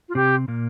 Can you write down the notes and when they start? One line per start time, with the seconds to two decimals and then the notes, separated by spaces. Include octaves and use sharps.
0.09 F4
0.15 C3 C4 G4
0.48 A#2 A#3